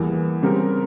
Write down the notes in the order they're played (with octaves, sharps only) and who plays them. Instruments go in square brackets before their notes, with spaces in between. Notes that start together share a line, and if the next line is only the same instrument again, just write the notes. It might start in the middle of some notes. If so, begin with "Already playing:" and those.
Already playing: [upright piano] E2 E3 G3 A#3
C#3 G3 C4 G4 A#4